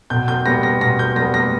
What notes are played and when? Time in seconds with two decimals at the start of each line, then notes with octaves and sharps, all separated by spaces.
0.10 B2 G6
0.28 G6
0.46 G3 B3 A#6
0.63 A#6
0.81 B2 A#6
0.99 G6
1.16 G3 B3 A#6
1.34 A#6